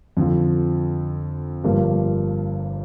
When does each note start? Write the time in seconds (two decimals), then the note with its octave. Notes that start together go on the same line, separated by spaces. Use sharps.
0.17 F2 D3 F3
1.64 G1 G2 F3 A#3